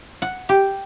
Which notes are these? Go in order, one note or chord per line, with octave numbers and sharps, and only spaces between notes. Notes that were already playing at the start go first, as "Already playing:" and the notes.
F#5
G4